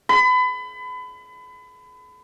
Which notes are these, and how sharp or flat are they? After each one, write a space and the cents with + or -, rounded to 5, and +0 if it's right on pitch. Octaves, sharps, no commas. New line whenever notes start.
B5 +30